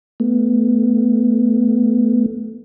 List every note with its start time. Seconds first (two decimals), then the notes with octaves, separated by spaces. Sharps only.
0.20 A3 B3